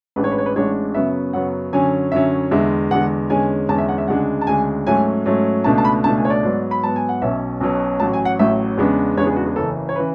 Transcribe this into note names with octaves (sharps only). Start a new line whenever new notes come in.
A1 A2 G#3 D4 B4
C#5
B4
C#5
B4
A1 A2 G#3 D4 C#5
F#2 C#3 F#3 B3 E5
F#2 C#3 F#3 B3 F#5
F#2 D3 F#3 C#4 G#5
F#2 D3 F#3 C#4 E5
E2 D3 G#3 E5
E2 D3 G#3 F#5
E2 D3 G#3 C#4 G#5
E2 D3 G#3 C#4 A5
E5
F#5
E5
D2 C#3 G#3 D4 F#5
A5
D2 C#3 G#3 D4 G#5
G#2 F#3 A3 C#4 G#5
G#2 F#3 A3 C#4
C#2 B2 A3 D4 A5
A5
B5
C#2 B2 A3 D4 A5
G#5
C#5
D5
G#2 F#3 B3
B5
G#2 F#3 B3 A5
G#5
F#5
B1 B2 F#3 C#4 E5
B1 B2 F#3 C#4
A1 A2 F#3 A5
G#5
F#5
A1 A2 F#3 E5
E2 C#3 G#3 B3 D4
E2 C#3 G#3 B3 D4 C#5
G#4
F#4
G#4
F#1 F#2 C#3 E3 A4
C#5
C#3 E3 B4